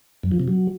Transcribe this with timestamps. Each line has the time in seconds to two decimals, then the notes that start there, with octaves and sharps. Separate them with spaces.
0.23 F#2
0.31 F3
0.40 C3
0.48 F#3